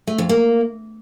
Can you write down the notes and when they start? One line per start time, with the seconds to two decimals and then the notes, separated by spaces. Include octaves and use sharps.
0.07 A3
0.18 F2
0.29 A#3